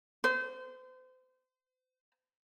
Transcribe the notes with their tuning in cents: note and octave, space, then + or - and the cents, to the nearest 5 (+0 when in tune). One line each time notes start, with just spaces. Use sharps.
C5 -35